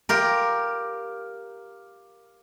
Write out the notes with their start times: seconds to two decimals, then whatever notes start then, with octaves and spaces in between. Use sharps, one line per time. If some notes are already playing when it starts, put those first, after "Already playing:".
0.09 F4 G4 A#4